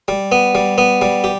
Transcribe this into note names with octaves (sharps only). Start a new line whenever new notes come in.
G3
B3
G3
B3
G3
G4